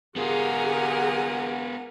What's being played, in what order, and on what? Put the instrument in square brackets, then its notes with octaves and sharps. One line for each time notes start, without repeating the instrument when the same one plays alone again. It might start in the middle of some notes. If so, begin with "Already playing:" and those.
[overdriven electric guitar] B3 F4 [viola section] G4 G#4 [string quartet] A#4 F#5 G#5